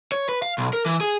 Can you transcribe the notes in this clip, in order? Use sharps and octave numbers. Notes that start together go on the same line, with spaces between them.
C#5
B4
F5
B1
A#4
E3
G#4